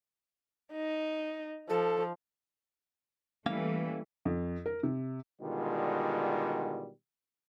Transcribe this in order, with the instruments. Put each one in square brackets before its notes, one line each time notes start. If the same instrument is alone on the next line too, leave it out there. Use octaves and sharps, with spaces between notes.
[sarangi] D#4
[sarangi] F3 [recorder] A4
[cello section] E3 G3 A3 [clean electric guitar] A#3 C#4 F5
[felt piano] F2
A#4
C3
[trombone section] B2 D3 D#3 G3 G#3 F4